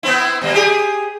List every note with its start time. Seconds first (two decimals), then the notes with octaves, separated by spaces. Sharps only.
0.03 B3 C4 E4
0.41 B2 G3 A#3
0.54 G4 G#4